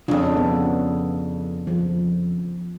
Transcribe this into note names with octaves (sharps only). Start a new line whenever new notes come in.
F2 C#3 C#4 D4 F4
B3
F3